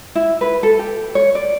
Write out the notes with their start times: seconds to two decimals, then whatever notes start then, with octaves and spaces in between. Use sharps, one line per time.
0.15 E4
0.41 B4
0.63 A4
0.79 G4
1.15 C#5
1.35 D5